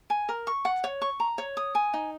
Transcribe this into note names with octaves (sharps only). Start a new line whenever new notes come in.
G#5
A#4
C#6
F#5
C#5
C#6
A#5
C#5
D#6
G#5
D#4